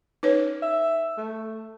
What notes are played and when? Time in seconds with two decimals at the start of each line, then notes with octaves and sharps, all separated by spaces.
0.23 C#4 D#4 B4 C#5
0.62 E5
1.18 A3